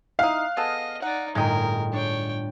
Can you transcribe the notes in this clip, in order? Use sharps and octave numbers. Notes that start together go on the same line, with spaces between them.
D#4 E4 F5 F#6
B3 G#4 A4 D#5
D#4 D5 F#5
G1 A2 G#3 D#4 G#4 A#4 G5
D4 C#5 G5